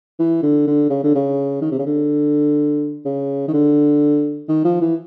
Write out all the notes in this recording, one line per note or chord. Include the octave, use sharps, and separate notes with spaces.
E3
D3
D3
C#3
D3
C#3
D#3
C3
C#3
D3
C#3
D#3
D3
D#3
F3
E3